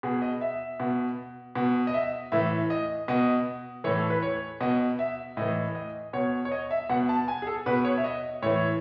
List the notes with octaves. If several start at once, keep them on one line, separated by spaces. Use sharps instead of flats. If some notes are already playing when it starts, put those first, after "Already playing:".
B2 G#4
D#5
E5
B2
B2
D#5
E5
A2 E3 E5
D#5
B2 D#5
A2 E3 C#5
A4
B4
C#5
B2 D#5
E5
A2 E3 D#5
D#5
B2 C#5
C#5
D#5
E5
B2 F#5
A5
G#5
G#4
A4
B2 B4
C#5
E5
D#5
A2 E3 C#5